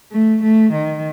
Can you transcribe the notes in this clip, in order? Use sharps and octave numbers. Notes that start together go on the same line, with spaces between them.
A3
A3
D#3